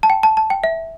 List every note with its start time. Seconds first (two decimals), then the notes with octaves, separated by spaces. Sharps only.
0.03 A5
0.10 G5
0.23 A5
0.37 A5
0.50 G5
0.64 E5